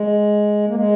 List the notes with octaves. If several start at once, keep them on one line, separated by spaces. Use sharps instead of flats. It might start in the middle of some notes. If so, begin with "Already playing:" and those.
Already playing: G#3
A#3
G#3